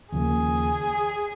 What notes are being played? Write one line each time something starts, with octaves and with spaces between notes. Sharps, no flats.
D#2 C#3 F3 A#3 G#4